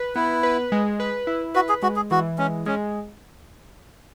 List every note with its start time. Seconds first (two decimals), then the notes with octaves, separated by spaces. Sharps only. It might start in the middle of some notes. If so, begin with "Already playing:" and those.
Already playing: B4
0.16 B3 E4
0.43 B4
0.72 G#3
1.00 B4
1.27 E4
1.55 F#4 B4
1.69 G#4
1.82 G#3 F#4
1.96 G#4
2.11 E3 F#4
2.38 G#3 C#4
2.66 G#3 C#4